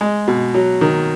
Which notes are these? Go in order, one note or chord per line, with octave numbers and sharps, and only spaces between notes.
G#3
B2
F#3
D#3